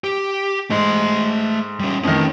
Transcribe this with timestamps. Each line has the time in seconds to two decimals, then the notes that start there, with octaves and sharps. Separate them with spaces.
0.04 G4
0.70 G#2 A3 C6
1.80 G3 C#4
2.04 F2 D#3 A3 C#4